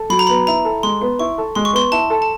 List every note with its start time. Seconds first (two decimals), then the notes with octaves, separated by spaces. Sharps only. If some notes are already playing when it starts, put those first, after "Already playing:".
Already playing: A4
0.10 F#3 B5
0.19 A#5
0.27 B3 B5
0.47 E4 A#5
0.65 A4
0.83 G#3 C6
1.01 B3
1.19 E4 C#6
1.38 A4
1.55 G#3 C6
1.65 C#6
1.73 B3 C6
1.92 E4 A5
2.10 A4
2.22 A5